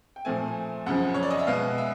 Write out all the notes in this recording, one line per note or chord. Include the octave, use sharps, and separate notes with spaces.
G5
A#2 F3 A3 C4 G#5
F#2 C#3 F3 F#5
C#5
D5
D#5
E5
B2 G#3 B3 F5
E5